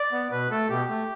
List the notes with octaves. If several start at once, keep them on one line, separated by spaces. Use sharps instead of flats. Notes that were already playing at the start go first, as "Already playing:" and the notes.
Already playing: D5
B3
B2 B4
A3 A4
B2 G4
A3